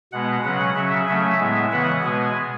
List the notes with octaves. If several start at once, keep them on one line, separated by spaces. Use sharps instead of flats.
B2 G#3 B3 F#5
C#3 F#3 C#4 F#5
C#3 F#3 C#4 E5
C#3 F#3 A3 C#4 E5
A2 G#3 B3
C#3 E3 B3 F#5
B2 G#3 B3 G#5